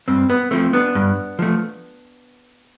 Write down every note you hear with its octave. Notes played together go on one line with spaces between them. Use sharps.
G2 C4
B3
F3 A3 C4
B3 D4
G2
F3 A3